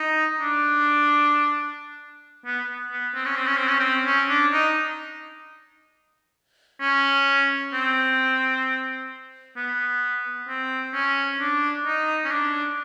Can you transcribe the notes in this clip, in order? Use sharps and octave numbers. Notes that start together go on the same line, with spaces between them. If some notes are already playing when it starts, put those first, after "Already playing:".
Already playing: D#4
D4
B3
B3
C4
C#4
C4
C#4
C4
C#4
C4
C#4
D4
D#4
C#4
C4
B3
C4
C#4
D4
D#4
C#4
D4